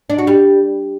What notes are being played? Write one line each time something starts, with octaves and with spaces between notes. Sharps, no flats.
D4
F#4
G3